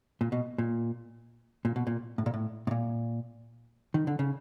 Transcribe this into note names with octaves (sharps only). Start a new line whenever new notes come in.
A#2
B2
A#2
A#2
B2
A#2
A2
A#2
A2
A2
A#2
D#3
D3
C#3